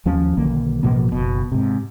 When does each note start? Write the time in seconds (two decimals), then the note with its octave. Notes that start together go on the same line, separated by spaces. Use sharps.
0.06 D#2 F3 C#4
0.37 B1 D3 D#3 A#3
0.83 A1 B2 F3 A#3
1.12 F#1 B2
1.52 G#2 C3